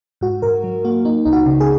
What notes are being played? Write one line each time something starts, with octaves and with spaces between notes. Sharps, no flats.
G#2 F#4
G#2 A#4
F#3
A#3 F#4
A#3 D#4
C#2 D#4
F#4
C#3
G#4